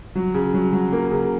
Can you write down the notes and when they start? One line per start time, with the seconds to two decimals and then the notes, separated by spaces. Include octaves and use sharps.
0.15 F#3
0.34 C#3
0.54 F#3
0.73 F#3
0.92 A#3
1.11 C#3